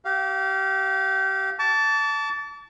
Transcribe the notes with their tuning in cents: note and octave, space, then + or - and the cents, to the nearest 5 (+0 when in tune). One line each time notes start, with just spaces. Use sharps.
G4 -30 F5 +0
A5 +0 D6 -40